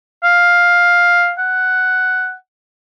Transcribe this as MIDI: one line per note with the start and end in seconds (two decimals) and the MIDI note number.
0.24 1.33 77
1.38 2.34 78